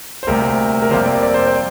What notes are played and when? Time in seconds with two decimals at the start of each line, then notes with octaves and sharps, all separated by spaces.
0.23 C5
0.27 D2 C3 G3 A#3 A#4
0.82 A#4
0.91 F2 C3 G3 A#3 C5
1.06 D5
1.23 D5
1.34 C5
1.47 D5